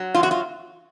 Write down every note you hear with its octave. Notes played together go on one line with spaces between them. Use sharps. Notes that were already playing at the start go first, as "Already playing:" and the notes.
Already playing: F#3
E2 F4
F#4
F4